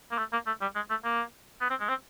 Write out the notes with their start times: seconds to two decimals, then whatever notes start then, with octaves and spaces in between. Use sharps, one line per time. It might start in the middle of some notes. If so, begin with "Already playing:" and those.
0.11 A#3
0.18 A3
0.33 A#3
0.47 A3
0.61 G3
0.75 G#3
0.90 A3
1.04 A#3
1.61 B3
1.70 C4
1.80 G#3
1.89 C4